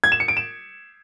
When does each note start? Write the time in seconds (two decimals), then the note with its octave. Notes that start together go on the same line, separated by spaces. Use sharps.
0.04 G#6
0.12 E7
0.20 C#7
0.28 D7
0.37 E7